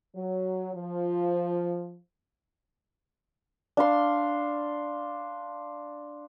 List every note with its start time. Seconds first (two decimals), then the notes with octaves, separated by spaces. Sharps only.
0.16 F#3
0.74 F3
3.77 D4 F5 C6